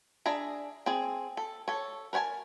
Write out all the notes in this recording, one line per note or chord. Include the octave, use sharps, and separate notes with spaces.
D4 G#4 E5 A#5
C4 G#4
A4
A4 C#5
A#4 B4 C#5 G#5 A5